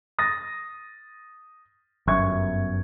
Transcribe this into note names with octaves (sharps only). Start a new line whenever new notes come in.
D#6 A6 A#6
G1 F#2 E5 C#6 G#6